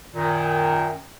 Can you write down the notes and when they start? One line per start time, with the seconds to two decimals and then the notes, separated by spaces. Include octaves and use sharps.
0.14 F#2 A#2 D#3